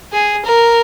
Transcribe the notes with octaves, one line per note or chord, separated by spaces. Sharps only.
G#4
A#4